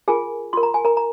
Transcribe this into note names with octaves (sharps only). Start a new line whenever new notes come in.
F4 G#4 A#4 G#5
F4 A#4 C6
A#5
G#5
A#4 A#5
A#5